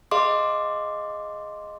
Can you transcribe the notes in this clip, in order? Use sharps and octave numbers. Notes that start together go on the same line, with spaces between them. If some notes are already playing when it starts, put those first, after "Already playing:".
G#4 D#5 F5 C6 D6